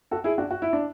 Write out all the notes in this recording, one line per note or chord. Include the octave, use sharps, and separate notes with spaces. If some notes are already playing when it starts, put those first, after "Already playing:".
F#4 A4
E4 G#4
D4 F#4
F#4
E4
D4